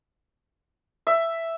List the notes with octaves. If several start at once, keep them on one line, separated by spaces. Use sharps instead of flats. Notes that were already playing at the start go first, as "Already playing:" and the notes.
E5